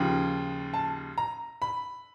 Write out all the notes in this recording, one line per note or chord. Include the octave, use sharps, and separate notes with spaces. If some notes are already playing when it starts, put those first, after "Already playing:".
Already playing: D#2 C#3 F3
A5
A#5
B5